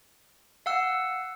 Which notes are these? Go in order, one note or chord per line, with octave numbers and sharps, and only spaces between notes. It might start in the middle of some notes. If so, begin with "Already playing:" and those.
F5 F#5 E6